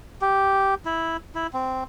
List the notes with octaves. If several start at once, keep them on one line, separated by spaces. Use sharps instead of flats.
G4
E4
E4
C4